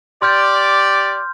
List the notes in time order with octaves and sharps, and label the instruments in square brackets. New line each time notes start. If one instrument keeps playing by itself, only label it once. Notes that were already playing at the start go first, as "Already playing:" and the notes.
[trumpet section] G4 D5 [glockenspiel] C6 F6 G6